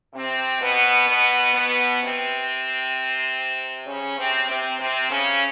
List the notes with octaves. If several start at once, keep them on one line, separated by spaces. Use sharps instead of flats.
C3 C4
B2 B3
B2 B3
B2 B3
C3 C4
C#3 C#4
C3 C4
C3 C4
C3 C4
C#3 C#4